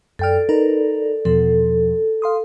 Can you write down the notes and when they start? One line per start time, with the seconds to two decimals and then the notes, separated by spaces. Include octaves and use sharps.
0.19 F#2 A4 D5 G5 F6
0.49 D#4 A#4 B4
1.25 E2 B2 F3 A4
2.22 F5 C6 D#6